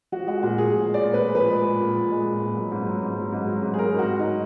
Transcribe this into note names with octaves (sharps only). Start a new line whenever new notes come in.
F3 F#4
G#3 F#4
A#2 F#4
A#2 G#4
F3
G#3
D5
A#2
B4
A#2
F3 B4
G#3
A#2
A#2
F3
G#3
A#2
A#2
F#3
G#2
F#3
G#2
F#3
G#2
F#3
G#2
G#4
F#3 A#4
G#2 F#4
F#3
D#4